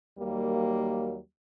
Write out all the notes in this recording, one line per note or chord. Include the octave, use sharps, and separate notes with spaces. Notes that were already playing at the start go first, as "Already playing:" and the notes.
D#2 F#3 G3 A#3